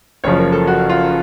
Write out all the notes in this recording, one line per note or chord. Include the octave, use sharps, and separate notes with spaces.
F#1 F#2 C#3 F3 C#5
A#4
A4
F#4
F4